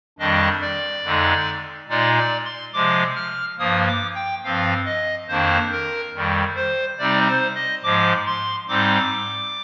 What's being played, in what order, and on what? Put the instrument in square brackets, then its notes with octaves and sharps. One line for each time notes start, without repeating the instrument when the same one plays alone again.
[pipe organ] F2 D#3 G3 D4 D#5
D5
F2 D3 G#3 D#4
A#2 G#3 D#4 D5
D5
C6
C3 F3 G#3 D6
F6
G2 F3 A#3 D#6
D6
G5
G2 F3 C4 F5
D#5
F2 D#3 A#3 D4 C5
A#4
F2 D#3 G3
C5
C3 G3 C4 D#4 D5
C5
D#5
G#2 F3 G#3 D6
C6
G#2 G3 C4 D#4 D6